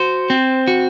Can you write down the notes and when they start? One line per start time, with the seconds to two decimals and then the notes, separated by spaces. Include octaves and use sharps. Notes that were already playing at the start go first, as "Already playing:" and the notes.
Already playing: F#4 C5
0.30 C4
0.68 F#4